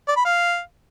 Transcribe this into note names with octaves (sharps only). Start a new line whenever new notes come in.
D5
B5
F5